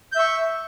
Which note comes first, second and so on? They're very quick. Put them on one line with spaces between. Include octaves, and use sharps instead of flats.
G6 E5 C#6